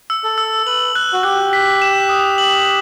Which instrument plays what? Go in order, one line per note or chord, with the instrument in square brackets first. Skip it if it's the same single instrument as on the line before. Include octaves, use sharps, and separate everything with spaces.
[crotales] E6
[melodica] A4
[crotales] E6
[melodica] B4 [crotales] F#7
[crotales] F#6
[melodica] F#4
[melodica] G4 [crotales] F#6
[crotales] B6
E7
D#6
F#7